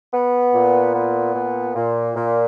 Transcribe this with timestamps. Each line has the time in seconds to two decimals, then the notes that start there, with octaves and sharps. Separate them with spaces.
0.14 B3
0.54 A#2
0.95 B3
1.34 A#2
1.75 A#2
2.15 A#2